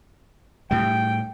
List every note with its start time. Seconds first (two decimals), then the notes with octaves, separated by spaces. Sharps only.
0.71 A2 G3 G5